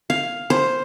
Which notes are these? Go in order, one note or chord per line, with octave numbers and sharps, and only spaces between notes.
F5
C5